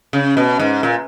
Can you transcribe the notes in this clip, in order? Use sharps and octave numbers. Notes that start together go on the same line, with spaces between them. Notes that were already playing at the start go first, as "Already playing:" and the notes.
C#3
B2
G#2
A#2